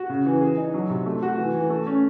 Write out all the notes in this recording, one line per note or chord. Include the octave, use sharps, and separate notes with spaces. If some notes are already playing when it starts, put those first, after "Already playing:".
Already playing: F#4
C#3
E3
G#4
D#4
F#3
C3
A3
F#4
E3
E3
A3
C#4